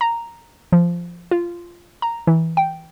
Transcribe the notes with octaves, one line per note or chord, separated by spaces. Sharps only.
A#5
F3
F4
A#5
E3
G5